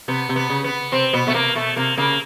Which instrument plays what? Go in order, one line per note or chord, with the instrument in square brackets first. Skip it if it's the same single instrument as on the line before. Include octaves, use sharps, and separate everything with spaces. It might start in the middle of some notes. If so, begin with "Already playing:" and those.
[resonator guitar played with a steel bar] C3 [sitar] B3
[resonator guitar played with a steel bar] C3
[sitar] B3
[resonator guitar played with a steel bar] C#3
[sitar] B3
[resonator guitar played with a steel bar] C3 [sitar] C4
[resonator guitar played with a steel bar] B2 [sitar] B3
[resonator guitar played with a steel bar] B2 [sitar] A3
[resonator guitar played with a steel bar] C3 [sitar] A#3
[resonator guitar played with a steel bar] B2 [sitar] A3
[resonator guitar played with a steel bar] C3 [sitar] A#3
[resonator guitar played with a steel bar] C#3 [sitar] A#3